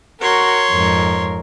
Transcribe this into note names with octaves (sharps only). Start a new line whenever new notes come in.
F#4 A#4 C#5 C6
F2 G#2 A#4